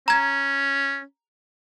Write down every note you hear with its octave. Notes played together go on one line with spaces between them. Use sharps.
C#4 A#5 G#6